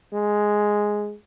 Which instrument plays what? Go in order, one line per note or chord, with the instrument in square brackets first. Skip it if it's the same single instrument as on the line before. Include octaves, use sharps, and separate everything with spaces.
[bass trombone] G#3